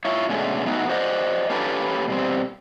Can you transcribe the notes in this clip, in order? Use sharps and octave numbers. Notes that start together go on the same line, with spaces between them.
E4 F4 C#5
B2 D3 G#3 A3 C#4
A3 B3 D#4 F#4
F#4 C5 D5 D#5 F#5
A#3 C#4 G4 A4 B4
B2 G3 C4